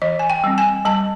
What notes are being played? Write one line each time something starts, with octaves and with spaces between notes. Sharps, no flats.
E3 D#5
G#5
G5
G3 C4
G#5
G3 A5